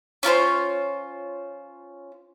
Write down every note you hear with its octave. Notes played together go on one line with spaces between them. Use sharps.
C#4 F4 A#4 C5